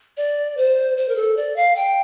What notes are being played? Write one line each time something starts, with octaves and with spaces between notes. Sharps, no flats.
D5
C5
C5
A#4
A4
D5
F5
G5